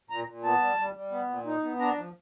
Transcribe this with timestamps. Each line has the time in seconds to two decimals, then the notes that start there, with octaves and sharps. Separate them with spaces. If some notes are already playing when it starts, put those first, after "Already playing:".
0.10 A#2 A#5
0.26 A#2
0.43 B3 A5
0.60 G3
0.78 G3
0.94 G3
1.11 B3
1.28 A#2
1.45 D#4
1.63 B3
1.79 D4 A#5
1.95 F3